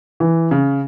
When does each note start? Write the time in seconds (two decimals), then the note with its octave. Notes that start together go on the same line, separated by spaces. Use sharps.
0.20 E3
0.51 C#3